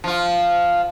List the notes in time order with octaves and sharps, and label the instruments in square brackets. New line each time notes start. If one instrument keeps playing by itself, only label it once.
[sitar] F3 F4